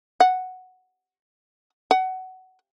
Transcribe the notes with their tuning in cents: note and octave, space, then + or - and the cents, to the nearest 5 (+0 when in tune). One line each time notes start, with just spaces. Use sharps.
F#5 +0
F#5 +20